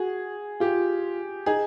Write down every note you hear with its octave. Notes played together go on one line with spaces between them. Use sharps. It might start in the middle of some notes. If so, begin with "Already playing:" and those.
Already playing: F#4 G#4
F4 G4
D#4 G#4